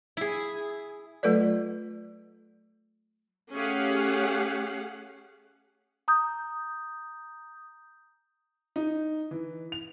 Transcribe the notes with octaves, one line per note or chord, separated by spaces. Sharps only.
E4 G#4
F#3 A3 F4 A4 B4 D5
A3 C#4 G4 G#4 F5 F#5
A#5 D#6 G6
D#4
E3
F7